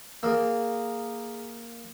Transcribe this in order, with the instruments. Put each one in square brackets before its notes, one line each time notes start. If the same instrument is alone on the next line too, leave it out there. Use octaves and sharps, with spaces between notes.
[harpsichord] A#3 [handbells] G#4 E6